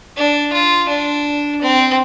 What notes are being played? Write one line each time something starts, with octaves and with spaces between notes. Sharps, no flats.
D4
F4
D4
C4